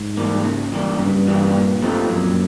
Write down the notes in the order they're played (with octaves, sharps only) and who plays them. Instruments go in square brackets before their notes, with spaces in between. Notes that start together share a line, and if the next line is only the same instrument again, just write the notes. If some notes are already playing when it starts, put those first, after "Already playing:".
Already playing: [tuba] G#2
[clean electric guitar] E3 G3 A#3
C#3
E3 G3 A#3
[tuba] G2 [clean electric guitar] C#3
[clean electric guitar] E3 G3 A#3
A#2
F3 A3 C4 D#4
[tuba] F#2 [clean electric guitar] A#2